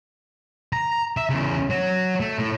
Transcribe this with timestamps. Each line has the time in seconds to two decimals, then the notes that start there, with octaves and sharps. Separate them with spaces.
0.73 A#5
1.17 E5
1.30 E2 C#3
1.70 F#3
2.20 A3
2.38 A2